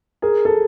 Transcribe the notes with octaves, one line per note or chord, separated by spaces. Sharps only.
G#4 A#4
A4